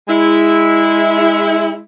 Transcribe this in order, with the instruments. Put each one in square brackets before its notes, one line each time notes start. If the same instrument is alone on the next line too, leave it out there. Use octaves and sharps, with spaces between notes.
[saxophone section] G#3 E4